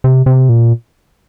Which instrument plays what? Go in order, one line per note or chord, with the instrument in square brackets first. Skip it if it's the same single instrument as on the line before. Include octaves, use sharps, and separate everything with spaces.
[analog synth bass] C3
C3
A#2